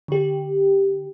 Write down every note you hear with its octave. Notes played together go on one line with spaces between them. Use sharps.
D3 G4